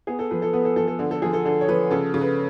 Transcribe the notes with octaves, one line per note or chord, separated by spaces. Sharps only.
B3 G#4
A4
F3 B4
A4
B3 B4
A4
F3 A4
A4
D3
A4
F3 G#4
A4
D3 A4
C#5
F3 B4
C#3 A4
C#3
B4